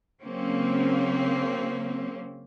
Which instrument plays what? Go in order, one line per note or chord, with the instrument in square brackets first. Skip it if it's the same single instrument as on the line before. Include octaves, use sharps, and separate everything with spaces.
[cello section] C#3 F#3 A#3 C4 C#4